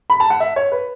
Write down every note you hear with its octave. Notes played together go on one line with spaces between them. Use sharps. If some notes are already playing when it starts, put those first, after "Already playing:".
B5
A5
F#5
E5
C#5
B4